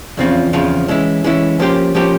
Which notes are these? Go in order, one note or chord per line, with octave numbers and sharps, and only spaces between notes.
E2 C#3 F3 C4 F4
E2 C#3 F3 C4 F4
E3 G#3 C#4 E4
E3 G#3 C#4 E4
F3 A#3 C#4 G4 C5
F3 A#3 C#4 G4 C5